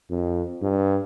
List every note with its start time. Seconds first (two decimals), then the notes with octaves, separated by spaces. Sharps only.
0.10 F2
0.62 G2